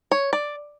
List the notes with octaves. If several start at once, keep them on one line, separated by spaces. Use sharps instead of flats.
C#5
D5